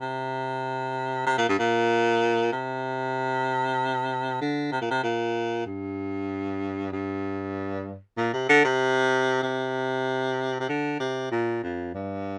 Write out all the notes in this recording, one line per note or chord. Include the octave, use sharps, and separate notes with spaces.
C3
C3
A#2
G2
A#2
C3
D3
C3
A#2
C3
A#2
G2
G2
A#2
C3
D3
C3
C3
C3
D3
C3
A#2
F2
G2